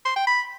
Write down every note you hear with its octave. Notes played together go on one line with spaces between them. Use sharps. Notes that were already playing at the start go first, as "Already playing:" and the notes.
C6
G5
B5